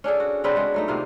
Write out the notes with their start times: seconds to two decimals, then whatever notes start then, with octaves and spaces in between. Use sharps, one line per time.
0.04 C#4 D4 G#4 A4
0.20 F#4
0.44 C#3 C4 D4 B4
0.56 G#3 B3 F#4
0.74 F#3 A3 D#4
0.88 C3 D#3 A#3 F4